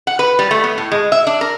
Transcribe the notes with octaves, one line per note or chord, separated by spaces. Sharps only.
F#5
B4
G3
A3
B3
A2
G#3
E5
D4
A#4